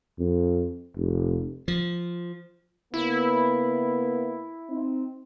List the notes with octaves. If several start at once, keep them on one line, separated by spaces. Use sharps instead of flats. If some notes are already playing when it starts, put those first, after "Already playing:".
F2
F1
F3
C#3 A#3 B3 E4
C4 D#4